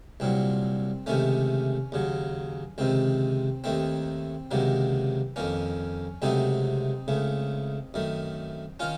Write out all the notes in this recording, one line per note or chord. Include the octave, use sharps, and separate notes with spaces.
C2 A#2 F#3 C4
C#2 C3 D#3 A3 C#4
D#2 C#3 F#3
C#2 C3 D#3 C4
D#2 D#3 A3 C4
C#2 C3 D#3 F#3 A#3
F2 D#3 A#3 C#4
C#2 C3 F#3 A3 C4 D#4
C#2 C#3 A3
F#2 D#3 A3
D#3 C#4 F4